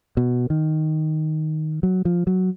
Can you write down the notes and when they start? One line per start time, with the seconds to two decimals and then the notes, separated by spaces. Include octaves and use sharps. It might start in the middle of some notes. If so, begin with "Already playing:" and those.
0.17 B2
0.50 D#3
1.83 F#3
2.05 F3
2.27 F#3